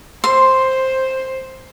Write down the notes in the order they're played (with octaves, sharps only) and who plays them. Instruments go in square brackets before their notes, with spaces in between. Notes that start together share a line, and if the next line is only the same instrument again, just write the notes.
[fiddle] C5 [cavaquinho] C6